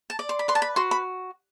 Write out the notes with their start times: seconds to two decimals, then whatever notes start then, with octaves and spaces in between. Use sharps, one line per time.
0.10 A5
0.19 D5
0.29 C6
0.39 B5
0.48 B4 C6
0.55 A5
0.62 B5
0.76 F#4 C6
0.91 B5